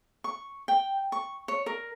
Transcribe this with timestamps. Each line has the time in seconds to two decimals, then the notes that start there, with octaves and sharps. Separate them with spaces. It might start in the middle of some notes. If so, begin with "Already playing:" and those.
0.24 C#6
0.68 G5
1.12 C#6
1.48 C#5
1.66 A#4